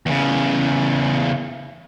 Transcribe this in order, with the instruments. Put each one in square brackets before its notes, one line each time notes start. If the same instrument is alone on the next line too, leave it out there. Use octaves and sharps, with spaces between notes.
[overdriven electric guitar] E2 C#3